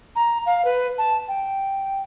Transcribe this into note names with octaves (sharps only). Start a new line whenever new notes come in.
A#5
F5
B4
A5
G5